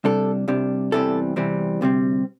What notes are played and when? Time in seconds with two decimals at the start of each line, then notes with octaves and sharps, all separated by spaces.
0.04 C2 C3 G3 D4 A4
0.48 C2 C3 G3 D4
0.92 E2 C3 E3 G3 C4 A4
1.36 E2 C3 E3 G3 C4
1.81 D2 C3 G3 C4